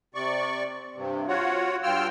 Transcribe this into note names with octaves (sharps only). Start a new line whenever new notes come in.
C3 D5 C#6
G2 C3
F4 F#4 C#5 F#5
G2 F4 G5 E6 F6